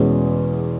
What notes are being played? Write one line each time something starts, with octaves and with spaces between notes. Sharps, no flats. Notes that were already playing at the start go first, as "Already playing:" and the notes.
Already playing: E2 B2 G#3 C#4